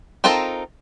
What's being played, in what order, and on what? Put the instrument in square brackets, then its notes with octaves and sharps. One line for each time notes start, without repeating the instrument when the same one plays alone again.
[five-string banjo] C4 D#4 F4 A4 A#4